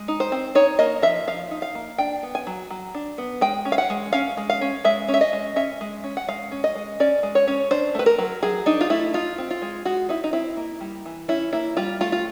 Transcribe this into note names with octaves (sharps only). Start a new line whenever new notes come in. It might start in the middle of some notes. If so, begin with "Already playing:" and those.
Already playing: G#3
D#4
C5
C4
D#4 C#5
A#3 D#5
F3 E5
F3 F5
D#4
F5
A#3
D4 G5
B3
G#5
F#3
F#3
D4
B3
G#3 G5
C#4
F5
F#5
G#3
C#4 F5
G#3
F5
C#4
G#3 E5
C#4
E5
D#5
G#3
C#4 E5
G#3
C#4
F#5
G#3 F5
C#4
D#5
G#3
C#4 D5
G#3
C#5
C#4
D4 C5
A3 B4
A#4
F#3
F#3 G#4
D4 D#4
F4
A3 E4
D#4 F4
C4
F4
G#3
G#3 F#4
D#4 E4
D#4
C4 E4
A#3
G3
E3
C#4 E4
A#3 E4
G3 F4
A3 F4
F4